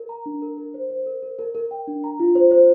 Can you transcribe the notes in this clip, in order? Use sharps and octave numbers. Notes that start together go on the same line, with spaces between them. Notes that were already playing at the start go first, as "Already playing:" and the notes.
Already playing: A#4
A#5
D4
A#4
A#4
C5
C5
A#4
A#4
A#4
A#4
G5
D4
A#5
F4
C5
C5